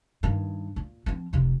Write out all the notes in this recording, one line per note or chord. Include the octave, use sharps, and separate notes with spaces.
G2 D#3
A#2
F3 C4
F1 C3